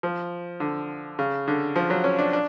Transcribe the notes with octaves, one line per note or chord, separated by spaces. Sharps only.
F3
D3
C#3
D3
F3
F#3
C#4
D4
D4